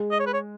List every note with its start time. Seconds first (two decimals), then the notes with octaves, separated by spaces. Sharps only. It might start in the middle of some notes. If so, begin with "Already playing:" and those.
Already playing: G#3
0.11 D#5
0.19 C#5
0.27 B4
0.34 C#5